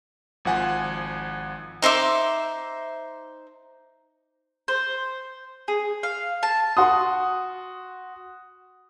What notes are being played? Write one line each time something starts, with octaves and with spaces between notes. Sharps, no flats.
G#1 F3 F#5 G#5
D#4 C5 E5 D6
C5
G#4
F5
A5
F#4 C6 D#6